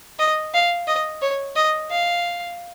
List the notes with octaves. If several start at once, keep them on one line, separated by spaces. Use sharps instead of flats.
D#5
F5
D#5
C#5
D#5
F5